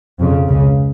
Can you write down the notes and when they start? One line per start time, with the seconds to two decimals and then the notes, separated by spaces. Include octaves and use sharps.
0.20 F2 C#3
0.47 C#2 C#3